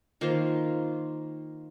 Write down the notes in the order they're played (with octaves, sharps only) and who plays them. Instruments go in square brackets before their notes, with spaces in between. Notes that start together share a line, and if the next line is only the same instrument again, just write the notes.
[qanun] D#3 A#3 F4 C5